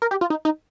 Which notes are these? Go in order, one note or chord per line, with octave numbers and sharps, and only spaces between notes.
A#4
G4
F4
D#4
D#4